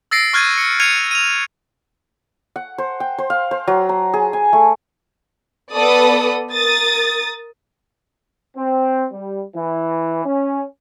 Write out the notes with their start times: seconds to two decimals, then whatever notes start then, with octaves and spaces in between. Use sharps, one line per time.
0.11 E6 A6 A#6 C7 D7
0.33 C#6 F6 F#6 G#6 A6 D#7
0.58 C#7
0.80 F6 G#6 C7 C#7 D#7 F7
1.11 D#7 F7
2.56 F#5
2.78 C5
3.00 G5
3.18 C5
3.30 F5
3.51 C5
3.67 F#3
3.89 A#5
4.13 G#4
4.33 G#5
4.53 A3
5.73 B3 A4 B4 D5 D#6
6.53 A#4 D#6 A6
8.57 C4
9.12 G3
9.56 E3
10.26 C#4